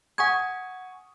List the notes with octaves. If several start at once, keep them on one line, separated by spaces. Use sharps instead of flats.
F#5 G#5 C#6 D#6 G#6